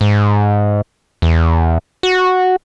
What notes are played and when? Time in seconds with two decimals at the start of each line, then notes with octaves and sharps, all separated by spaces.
0.01 G#2
1.22 E2
2.03 F#4